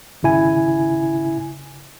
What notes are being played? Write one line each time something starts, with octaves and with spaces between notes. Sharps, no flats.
G#1 C#3 E4 G#5